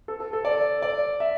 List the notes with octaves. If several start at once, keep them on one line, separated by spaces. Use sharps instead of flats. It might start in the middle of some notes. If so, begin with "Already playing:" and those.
A4
A4
A4
D5
D5
E5